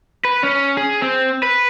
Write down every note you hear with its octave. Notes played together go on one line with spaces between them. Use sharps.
B4
C#4
G#4
C4
B4